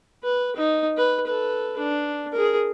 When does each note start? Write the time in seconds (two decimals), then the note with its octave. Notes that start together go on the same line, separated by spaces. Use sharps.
0.24 B4
0.57 D#4
0.97 B4
1.27 A4 B4
1.78 D4
2.32 G#4 A#4